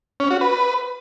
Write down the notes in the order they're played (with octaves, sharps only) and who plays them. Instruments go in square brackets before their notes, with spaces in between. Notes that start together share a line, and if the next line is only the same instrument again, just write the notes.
[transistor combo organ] C#4
F#4
B4